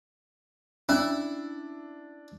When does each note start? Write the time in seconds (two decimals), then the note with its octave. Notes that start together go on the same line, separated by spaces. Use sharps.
0.89 C#4 D4 E4